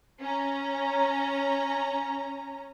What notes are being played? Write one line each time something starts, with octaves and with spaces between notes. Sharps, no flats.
C#4 A#5